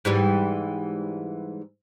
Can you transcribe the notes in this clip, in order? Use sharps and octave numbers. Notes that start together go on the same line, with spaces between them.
G#2 E3 G3